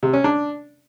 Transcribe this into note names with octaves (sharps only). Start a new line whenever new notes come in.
C3
C#4
D4